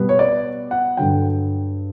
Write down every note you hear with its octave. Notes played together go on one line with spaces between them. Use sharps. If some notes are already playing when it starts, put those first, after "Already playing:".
Already playing: B2 G3 B3
C#5
D5
F#5
G2 D3 F#3 G5